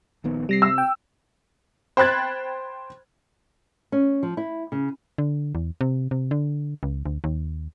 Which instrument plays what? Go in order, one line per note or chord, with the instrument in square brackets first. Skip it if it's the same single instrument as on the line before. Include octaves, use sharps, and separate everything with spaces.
[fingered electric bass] A#1 D#3 B3
[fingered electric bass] C3 [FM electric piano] G3 A#6 C7
[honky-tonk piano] E6
[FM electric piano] G5
[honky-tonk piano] C5 G5 B5 F#6 G#6 A6
[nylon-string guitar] C#4
F3
E4
C#3
[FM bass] D3
E2
C3
C3
D3
C#2
D2
D#2